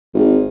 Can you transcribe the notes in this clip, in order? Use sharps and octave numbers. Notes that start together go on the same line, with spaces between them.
G#1